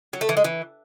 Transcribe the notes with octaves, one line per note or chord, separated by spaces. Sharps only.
F#3
A3
E3
G#3
E3